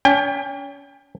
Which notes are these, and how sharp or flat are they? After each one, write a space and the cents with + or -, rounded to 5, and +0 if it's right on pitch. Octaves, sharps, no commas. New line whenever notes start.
C#4 +35 G5 +35